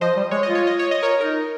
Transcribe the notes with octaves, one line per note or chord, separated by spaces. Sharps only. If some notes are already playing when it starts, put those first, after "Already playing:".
F3 C5 D#5
G3
G#3 C#5
F4 D#5
C#5
D#5
C#5
D#5
A#4 C#5
D#4 A#4